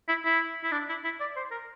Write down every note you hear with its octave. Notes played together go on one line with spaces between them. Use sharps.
E4
E4
E4
D4
E4
E4
D5
C5
A#4